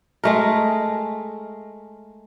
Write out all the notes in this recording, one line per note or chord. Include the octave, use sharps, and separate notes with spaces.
G#3 A3 A#4